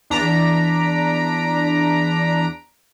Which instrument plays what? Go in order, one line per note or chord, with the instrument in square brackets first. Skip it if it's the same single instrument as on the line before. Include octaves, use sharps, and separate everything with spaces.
[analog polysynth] E2 D4 A#5 B6 D7